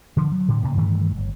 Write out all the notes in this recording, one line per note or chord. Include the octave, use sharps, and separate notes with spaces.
D3 F3
F#3
A2 D3
A2 C#3 A#3
G2 D#3 E3 A3
G1